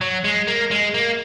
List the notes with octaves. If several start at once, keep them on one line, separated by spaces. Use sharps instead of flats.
F#3
G#3
A#3
G#3
A#3